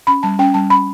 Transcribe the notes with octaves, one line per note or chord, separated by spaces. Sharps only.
C#4 B5
G3 A5
C#4 G5
G3 A5
C#4 B5